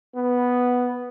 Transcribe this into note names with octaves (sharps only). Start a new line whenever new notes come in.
B3